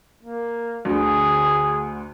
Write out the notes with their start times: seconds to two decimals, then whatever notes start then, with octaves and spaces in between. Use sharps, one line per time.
0.23 A#3
0.85 D2 D3 G#4